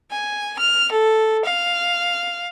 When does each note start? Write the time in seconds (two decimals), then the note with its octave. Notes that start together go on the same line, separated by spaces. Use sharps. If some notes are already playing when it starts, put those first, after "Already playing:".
0.10 G#5
0.57 F6
0.89 A4
1.43 F5